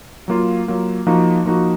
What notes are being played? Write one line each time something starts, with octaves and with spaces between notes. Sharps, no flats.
F#3 A#3 F4
F#3 A#3 F4
F3 A#3 D#4 F#4
F3 A#3 D#4 F#4